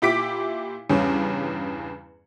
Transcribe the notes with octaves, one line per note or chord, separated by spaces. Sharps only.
A#2 E4 G4 D6 B6 D7
E2 G2 C#3 C#4